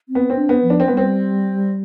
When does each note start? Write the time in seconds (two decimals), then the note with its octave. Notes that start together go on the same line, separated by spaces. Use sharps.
0.09 C4
0.15 B3
0.30 C4
0.35 D4
0.49 B3
0.63 F3
0.70 D4
0.80 C4
0.88 G3 B3
0.97 C4